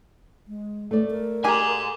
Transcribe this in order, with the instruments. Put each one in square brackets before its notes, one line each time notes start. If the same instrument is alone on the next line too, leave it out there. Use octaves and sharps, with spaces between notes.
[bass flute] G#3
[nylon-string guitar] A3 D5
[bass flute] A#4
[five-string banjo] G4 G#4 [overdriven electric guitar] G#5 A#5